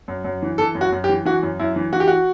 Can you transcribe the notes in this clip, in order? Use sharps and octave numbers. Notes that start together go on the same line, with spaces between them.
F#2
F#2
E3
E3 A4
F#2
F#4
F#2
G4
E3
E3 F#4
F#2
F#2 E4
E3
E3 F#4
G4
F#4